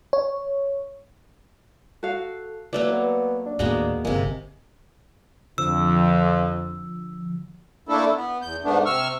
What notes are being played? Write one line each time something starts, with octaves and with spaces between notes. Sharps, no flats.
C#5
F#4 A4 F5
E3 F#3 A3 A#3 B4 D5
B3
D4
D#2 A2 G#3 A#3 B3 F#4
G1 C3 G#3 A#3
F2 D3 F3 E6
A3 A#3 D4 E4 A4
B3
E2 G6
G#2 A3 B3 D4
C3 C#6 E6 F6